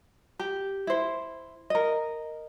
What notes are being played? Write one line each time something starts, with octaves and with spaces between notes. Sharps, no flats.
G4
E4 C5
A#4 D#5